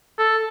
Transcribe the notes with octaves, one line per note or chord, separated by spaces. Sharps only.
A4